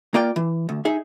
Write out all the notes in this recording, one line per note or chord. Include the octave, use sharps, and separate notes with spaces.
A#3 F4 D5 G5
E3
D2
D#4 G#4 E5